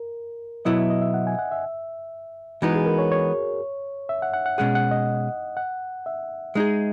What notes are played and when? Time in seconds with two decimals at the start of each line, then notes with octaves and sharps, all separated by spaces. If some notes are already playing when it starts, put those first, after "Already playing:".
Already playing: A#4
0.65 B2 F#3 B3 E4 D#5
0.78 E5
0.90 D#5
1.02 E5
1.14 F#5
1.27 G#5
1.39 F#5
1.52 E5
2.62 E3 G#3 B3 D#4 F#4
2.75 G#4
2.86 A#4
2.99 C#5
3.12 C#5
4.09 E5
4.22 F#5
4.34 F#5
4.46 F#5
4.58 B2 G#3 C#4 G#4 F#5
4.75 F#5
4.91 D#5
5.57 F#5
6.06 E5
6.55 G#3 D#4 G#4